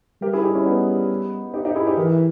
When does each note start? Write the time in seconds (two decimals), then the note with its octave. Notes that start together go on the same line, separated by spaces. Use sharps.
0.22 G3 G4 A#4
0.33 E4 G#4
0.43 D#4 G4
0.55 C#4 E4
0.66 B3 D#4
1.54 D#4 G4
1.65 D#4 G4
1.76 E4 G#4
1.87 D#4 G4
1.97 E3 G4 A#4